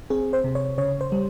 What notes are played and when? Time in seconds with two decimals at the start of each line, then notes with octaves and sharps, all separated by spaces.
0.10 C4 G#4
0.33 C5
0.44 C3
0.55 C#5
0.78 C#3 C#5
1.01 C5
1.12 G3